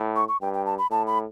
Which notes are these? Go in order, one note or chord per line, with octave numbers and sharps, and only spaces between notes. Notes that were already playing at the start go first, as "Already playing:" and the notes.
Already playing: A2
C#6
C#6
G2 G5
G5
A5
B5
A2 A5
B5